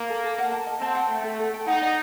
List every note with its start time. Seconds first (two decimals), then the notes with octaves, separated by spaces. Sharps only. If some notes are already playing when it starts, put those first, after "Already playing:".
Already playing: A#3
0.09 A4
0.24 A4
0.38 F#5
0.52 A5
0.66 D#5
0.81 C4 A5
0.95 F#5
1.09 A3 G5
1.24 A4
1.39 A4
1.54 G5
1.67 D#4 F#5
1.81 D5